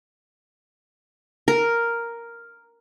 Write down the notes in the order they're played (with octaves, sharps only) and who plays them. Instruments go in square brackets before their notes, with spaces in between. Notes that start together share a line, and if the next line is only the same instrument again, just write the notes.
[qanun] A#4